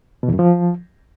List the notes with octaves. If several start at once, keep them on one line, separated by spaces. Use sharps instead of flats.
B2
E2
F#2
F3